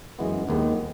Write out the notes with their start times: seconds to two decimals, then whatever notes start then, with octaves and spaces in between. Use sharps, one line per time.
0.19 F#2 E3 G#3 B3
0.49 D#2 D#3 G#3 B3